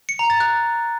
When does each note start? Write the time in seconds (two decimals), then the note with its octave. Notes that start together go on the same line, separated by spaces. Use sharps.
0.09 C#7
0.19 A#5
0.30 A6
0.40 F#6